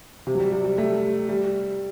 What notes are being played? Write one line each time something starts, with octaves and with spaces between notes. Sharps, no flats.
C3
F#3
G3
G3
G3
A3
G3